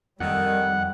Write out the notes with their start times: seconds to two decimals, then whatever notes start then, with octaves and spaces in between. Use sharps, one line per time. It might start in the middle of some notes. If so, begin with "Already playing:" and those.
0.20 F2 D#3 G3 F#5